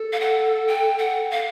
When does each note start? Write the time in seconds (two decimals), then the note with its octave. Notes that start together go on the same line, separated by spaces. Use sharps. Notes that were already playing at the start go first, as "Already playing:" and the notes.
Already playing: A4
0.13 F5
0.20 F#5
0.67 G5
0.98 F#5
1.31 F5